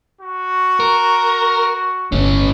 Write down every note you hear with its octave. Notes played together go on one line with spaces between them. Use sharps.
F#4
A#4
G1 A2 D3 C#4